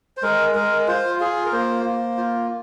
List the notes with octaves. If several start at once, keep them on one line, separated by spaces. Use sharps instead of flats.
C5
G#3 A#4
G#3 A#4
F4 C5
F4 G#4
A#4
A#3 C5
A#3
F4